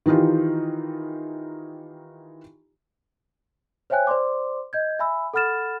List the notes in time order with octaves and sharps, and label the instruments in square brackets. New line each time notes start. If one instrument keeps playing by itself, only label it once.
[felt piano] D#3 E3 D#4 F4 G4
[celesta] C5 C#5 E5 G5 G#5 F#6
C5 D5 C6 D6
D#5 G6 G#6
E5 G#5 B5 E6
A4 F#5 B5 F6 A6 E7